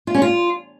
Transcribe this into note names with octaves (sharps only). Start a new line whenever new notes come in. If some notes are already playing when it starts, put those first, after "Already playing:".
F4
C#4
F4